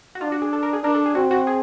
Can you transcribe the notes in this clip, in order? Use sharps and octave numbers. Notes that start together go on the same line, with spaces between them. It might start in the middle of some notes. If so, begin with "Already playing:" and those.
F#4
D4 F4
F#4
G#4
A4
A#4
G#4
D4 A#4
A4
G#4
C4 F#4
F#4
G#4